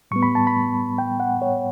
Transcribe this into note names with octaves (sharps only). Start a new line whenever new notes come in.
A2 G3 B3 C#6
B5
A5
B5
G5
F#5
C#5